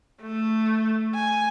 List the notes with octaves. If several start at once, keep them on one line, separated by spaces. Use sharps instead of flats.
A3
G#5